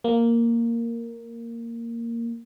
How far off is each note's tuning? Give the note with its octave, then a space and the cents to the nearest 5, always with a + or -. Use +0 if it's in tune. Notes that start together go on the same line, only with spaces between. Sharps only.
A#3 -5